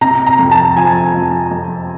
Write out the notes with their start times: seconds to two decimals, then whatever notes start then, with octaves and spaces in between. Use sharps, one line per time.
0.01 C3 A#5
0.27 A#5
0.39 F2
0.51 A5
0.76 F3 G#5
1.14 F2
1.51 F2